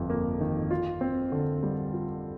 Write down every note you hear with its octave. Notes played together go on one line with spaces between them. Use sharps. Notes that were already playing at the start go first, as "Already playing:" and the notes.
Already playing: G1 F2
A#3
D#3
F4
C4
D3
G3
F4